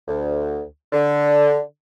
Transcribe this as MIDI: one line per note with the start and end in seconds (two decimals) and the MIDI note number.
0.08 0.62 38
0.93 1.60 50